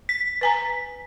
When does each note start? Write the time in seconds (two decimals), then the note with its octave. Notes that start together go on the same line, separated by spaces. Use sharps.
0.09 B6
0.41 B4 G#5 A#5